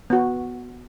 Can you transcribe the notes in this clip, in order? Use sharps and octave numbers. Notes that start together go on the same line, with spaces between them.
B3 F#4